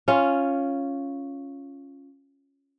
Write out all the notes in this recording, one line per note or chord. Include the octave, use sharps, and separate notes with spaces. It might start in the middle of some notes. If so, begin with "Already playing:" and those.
C#4 F4